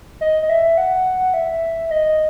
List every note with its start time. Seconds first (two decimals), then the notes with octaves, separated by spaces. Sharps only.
0.21 D#5
0.42 D#5
0.49 E5
0.78 F#5
1.34 E5
1.91 D#5